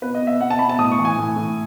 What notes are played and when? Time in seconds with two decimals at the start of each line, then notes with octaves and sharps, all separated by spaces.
0.02 B2 B4
0.14 D#5
0.21 B2
0.27 E5
0.41 B2 F#5
0.50 A5
0.59 B2 B5
0.69 A5
0.79 A2 D#6
0.92 C#6
0.99 E3
1.05 G#5
1.18 A2
1.36 A2